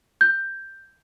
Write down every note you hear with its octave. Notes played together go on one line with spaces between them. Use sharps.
G6